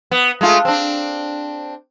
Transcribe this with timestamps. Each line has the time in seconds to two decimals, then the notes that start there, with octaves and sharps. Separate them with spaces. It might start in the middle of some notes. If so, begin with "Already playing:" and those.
0.11 B3
0.41 G#3 A3 F4
0.65 C4 D4